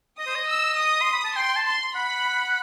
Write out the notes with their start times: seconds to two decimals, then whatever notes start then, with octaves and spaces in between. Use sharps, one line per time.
0.19 D#5 D#6
0.27 C5
0.35 D#5
0.48 E6
0.77 D#6
1.02 C6
1.13 B5
1.24 A5
1.36 G5 C6
1.56 A5
1.65 C6
1.95 F#5 B5